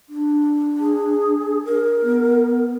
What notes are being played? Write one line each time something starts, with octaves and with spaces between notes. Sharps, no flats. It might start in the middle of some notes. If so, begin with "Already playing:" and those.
D4
G#4
A#4
B3